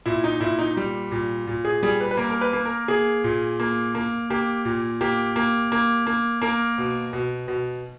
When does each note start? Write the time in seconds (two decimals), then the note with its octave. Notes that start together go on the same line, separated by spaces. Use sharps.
0.06 A#2 E4
0.24 D#4
0.40 A#2 E4
0.59 D#4
0.77 G3
1.11 A#2
1.47 A#2
1.65 G#4
1.83 G3 G#4
2.00 B4
2.11 B4
2.17 A#3 A#4
2.30 A#4
2.41 B4
2.53 A#3
2.65 A#4
2.88 A#3 G#4
3.24 A#2
3.60 A#3
3.95 A#3
4.30 A#3 G4
4.65 A#2
5.01 A#3 G4
5.36 A#3
5.72 A#3
6.07 A#3
6.42 A#3 A#4
6.78 B2
7.13 B2
7.48 B2